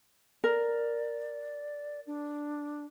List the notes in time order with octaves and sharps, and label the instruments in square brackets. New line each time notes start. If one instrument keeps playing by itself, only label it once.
[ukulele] A#4 [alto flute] D5
[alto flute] D4